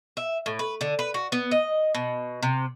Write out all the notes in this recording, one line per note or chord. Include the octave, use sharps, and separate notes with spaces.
E5
A2
B4
D3
B4
F#4
B3
D#5
B2
C3